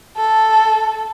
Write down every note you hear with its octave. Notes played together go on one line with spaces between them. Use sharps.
A4